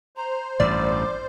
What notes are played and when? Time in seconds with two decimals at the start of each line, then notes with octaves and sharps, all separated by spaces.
0.17 C5 A#5
0.60 A1 G2 D5 D6